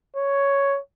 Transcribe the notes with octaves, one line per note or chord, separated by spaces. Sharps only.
C#5